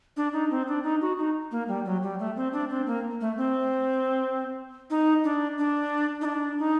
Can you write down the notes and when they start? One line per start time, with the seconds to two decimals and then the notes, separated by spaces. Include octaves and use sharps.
0.17 D4
0.33 D#4
0.51 C4
0.68 D4
0.83 D#4
1.01 F#4
1.18 D#4
1.51 A#3
1.68 G3
1.85 F#3
2.03 G3
2.19 A3
2.37 C4
2.53 D4
2.70 C4
2.87 A#3
3.21 A3
3.37 C4
4.90 D#4
5.24 D4
5.58 D4
6.21 D#4
6.25 D4
6.59 D#4